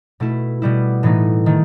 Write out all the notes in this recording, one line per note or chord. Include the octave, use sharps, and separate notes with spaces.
B2 A3 E4
B2 G3 B3 E4
A2 E3 A3 D#4
D#3 A3